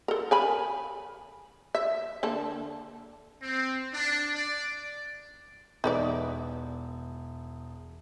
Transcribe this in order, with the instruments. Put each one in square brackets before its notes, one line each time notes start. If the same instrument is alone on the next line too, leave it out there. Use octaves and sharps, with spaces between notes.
[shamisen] A4 A#4
A#4 G#5 B5
E5
D3 A#3 A4
[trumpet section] C4
D4
D5
[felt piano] E1 G#4 E5 [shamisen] D#4 B4 D5